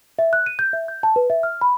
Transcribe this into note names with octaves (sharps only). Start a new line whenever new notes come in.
E5
F#6
D#7
G6
E5
G6
A5
B4
E5
F6
B5